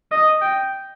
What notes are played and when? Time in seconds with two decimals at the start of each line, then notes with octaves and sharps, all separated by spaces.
0.12 D#5
0.42 G5